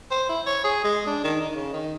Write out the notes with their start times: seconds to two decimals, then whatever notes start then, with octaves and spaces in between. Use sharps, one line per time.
0.11 C5
0.29 E4
0.46 C#5
0.64 G#4
0.84 G#3
1.07 D4
1.24 D#3
1.40 D#4
1.55 C#3
1.73 D#3